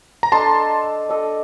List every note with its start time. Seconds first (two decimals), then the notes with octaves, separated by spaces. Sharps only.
0.23 A#5
0.32 D4 A4 D#5 A5 C6
1.09 D4 A4 D#5